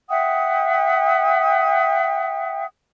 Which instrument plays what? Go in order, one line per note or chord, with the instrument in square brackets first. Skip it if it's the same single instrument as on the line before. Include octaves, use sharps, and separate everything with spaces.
[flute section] E5 F#5 G5 D#6